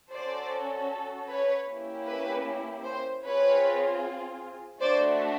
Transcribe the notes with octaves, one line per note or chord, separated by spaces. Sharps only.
C#4 F#4 A4 C5 D5
B4 C#5
A#3 C#4 E4 G4
B4
C5
C4 F4 G#4 B4 C#5
A3 D4 F#4 C5 D5